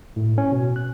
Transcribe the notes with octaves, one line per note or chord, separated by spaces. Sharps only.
A2
C#4
B2
F#6